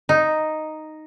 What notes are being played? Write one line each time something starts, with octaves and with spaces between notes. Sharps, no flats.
D#4